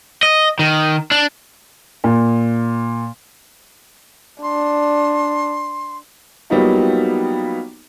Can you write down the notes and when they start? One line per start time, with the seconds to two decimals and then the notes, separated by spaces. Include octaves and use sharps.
0.23 D#5
0.59 D#3
1.11 D4
2.04 A#2
4.43 D4 C6
6.50 F#3 G3 A#3 B3 D#4 F4